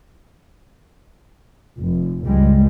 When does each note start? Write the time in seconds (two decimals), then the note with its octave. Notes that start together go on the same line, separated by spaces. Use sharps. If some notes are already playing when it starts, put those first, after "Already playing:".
1.78 F1
2.26 C#2 G2 G3 G#3